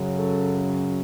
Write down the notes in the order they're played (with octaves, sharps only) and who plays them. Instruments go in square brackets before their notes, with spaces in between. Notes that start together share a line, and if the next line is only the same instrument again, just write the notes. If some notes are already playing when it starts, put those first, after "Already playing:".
Already playing: [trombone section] F#2 C#3 F#3
A4